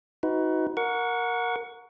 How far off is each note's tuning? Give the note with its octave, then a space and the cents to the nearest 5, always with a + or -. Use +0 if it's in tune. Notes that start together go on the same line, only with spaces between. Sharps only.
D#4 +30 F#4 +0 B4 +25
A#4 +0 F#5 -20 C#6 +20